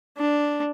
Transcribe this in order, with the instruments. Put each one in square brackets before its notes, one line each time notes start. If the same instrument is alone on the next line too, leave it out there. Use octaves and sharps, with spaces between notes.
[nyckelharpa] D4